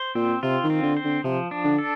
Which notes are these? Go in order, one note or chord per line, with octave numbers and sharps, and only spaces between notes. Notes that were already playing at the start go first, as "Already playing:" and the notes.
Already playing: C5
A#2 C4
C3 F4
D#3
C4
D3
C5
D3
C3 F3
D4
D3
A4